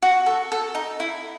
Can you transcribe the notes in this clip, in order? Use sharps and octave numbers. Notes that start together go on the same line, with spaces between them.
F#4
A4
A4
D#4
E4